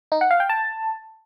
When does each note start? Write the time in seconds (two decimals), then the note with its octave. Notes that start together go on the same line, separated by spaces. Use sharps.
0.12 D#4
0.21 F#5
0.31 F5
0.40 G5
0.49 A5